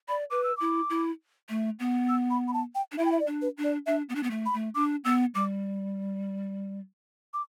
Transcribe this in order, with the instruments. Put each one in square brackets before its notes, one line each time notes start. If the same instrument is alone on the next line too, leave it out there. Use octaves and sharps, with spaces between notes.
[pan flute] D5 [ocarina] B5
[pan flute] B4 [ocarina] D6
[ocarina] E6
[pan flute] E4 [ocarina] D6
[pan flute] E4
A3
B3
[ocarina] E6
B5
B5
A5
G5
[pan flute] D4
[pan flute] E4 [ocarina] E5
[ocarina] G5
E5
D5
[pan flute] D4
[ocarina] B4
[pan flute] D4
[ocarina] D5
[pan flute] D4 [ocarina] E5
[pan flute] B3
D4
B3
A3
[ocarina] B5
[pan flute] A3
[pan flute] D4 [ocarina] D6
[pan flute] B3 [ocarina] E6
[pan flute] G3 [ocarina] D6
[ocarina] D6